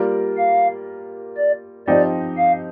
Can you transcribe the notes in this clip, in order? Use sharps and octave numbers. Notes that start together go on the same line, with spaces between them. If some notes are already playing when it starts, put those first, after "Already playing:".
Already playing: G3 A#3 F4 A#4 D5
F5
D5
F3 C4 D#4 G4 D5
F5